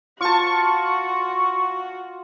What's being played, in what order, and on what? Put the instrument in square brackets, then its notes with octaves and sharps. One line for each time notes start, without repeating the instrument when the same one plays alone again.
[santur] F4 A5 [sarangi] F#4 [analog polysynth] C#6